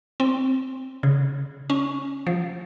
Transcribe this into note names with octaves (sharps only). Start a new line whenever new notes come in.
C4
C#3
C#4
F3